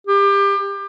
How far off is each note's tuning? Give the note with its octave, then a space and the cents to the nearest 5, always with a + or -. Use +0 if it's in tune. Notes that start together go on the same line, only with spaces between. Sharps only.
G4 +25